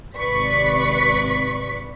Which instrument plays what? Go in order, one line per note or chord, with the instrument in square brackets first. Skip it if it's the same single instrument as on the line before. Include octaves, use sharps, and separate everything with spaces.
[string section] G#1 C3 B4 D5 C#6 B6